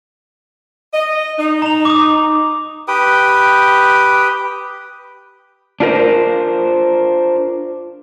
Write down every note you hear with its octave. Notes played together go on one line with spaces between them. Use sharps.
D#5
D#4
A#5 F7
D6 D#6
G4 B4 G5 D#6
D4 F4 A#4 C5